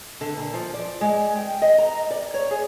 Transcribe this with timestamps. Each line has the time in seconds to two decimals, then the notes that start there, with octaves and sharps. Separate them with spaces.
0.21 D3
0.36 A#2
0.54 F3
0.74 D5
1.01 G#3
1.37 G5
1.62 D#5
1.78 A#5
2.11 D5
2.34 C#5
2.51 G#4